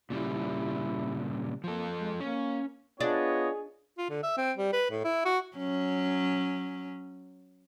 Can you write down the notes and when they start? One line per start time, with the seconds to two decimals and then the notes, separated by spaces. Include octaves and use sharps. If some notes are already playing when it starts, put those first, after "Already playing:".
0.10 A#2 C#3 G3 E4
1.64 F3 A#3 A4
1.99 G#3
2.20 A#3 C#4
3.01 B3 D4 F4 G#4 C#5 D#5
3.98 F4
4.10 D3
4.23 E5
4.37 C4
4.57 G3
4.73 B4
4.91 A2
5.04 E4
5.25 F#4
5.57 F#3 C#4